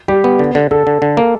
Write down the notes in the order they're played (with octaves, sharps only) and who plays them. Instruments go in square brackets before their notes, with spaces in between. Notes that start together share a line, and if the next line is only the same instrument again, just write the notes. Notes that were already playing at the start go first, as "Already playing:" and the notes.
[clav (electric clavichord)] G3 [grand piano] G4
[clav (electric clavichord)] B3
D3
D3
[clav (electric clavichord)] D3 [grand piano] A4
[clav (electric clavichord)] D3
D3
A#3